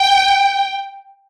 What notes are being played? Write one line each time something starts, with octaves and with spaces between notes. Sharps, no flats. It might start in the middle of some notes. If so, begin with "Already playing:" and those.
Already playing: G5